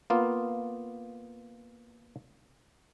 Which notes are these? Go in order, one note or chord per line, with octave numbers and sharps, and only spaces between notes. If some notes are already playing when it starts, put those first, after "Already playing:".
A#3 B3 F4